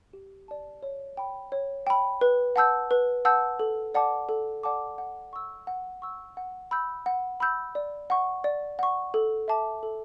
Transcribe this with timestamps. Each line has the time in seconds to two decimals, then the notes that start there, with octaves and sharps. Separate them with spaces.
0.13 G4
0.48 D5 A5
0.82 C#5
1.17 G5 B5
1.52 C#5
1.87 G5 B5
2.21 B4
2.56 F#5 A5 E6 G6
2.91 B4
3.25 F#5 A5 E6 G6
3.59 A4
3.95 D5 F#5 A5 D6
4.29 A4
4.63 D5 F#5 A5 D6
4.98 F#5
5.33 C#6 E6
5.67 F#5
6.02 C#6 E6
6.37 F#5
6.71 B5 E6 G6
7.06 F#5
7.40 B5 E6 G6
7.75 D5
8.10 F#5 C#6
8.44 D5
8.79 F#5 C#6
9.14 A4
9.48 E5 A5 D6
9.83 A4